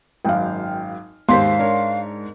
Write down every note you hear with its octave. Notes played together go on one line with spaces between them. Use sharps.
G#1 F#2 F5 G5
D#2 G#2 G4 C5 F5 C6 B6
D4 A#4 C#5